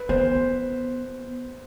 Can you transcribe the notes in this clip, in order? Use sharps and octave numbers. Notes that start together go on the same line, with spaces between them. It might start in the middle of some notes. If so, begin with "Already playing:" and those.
Already playing: B4
B3 C5